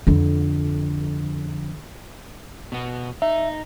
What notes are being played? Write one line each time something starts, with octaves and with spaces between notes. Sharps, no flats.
F2 D3
B2 B3
D#4 E5